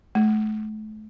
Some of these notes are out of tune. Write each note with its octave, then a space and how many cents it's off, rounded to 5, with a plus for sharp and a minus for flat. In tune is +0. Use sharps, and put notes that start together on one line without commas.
A3 -35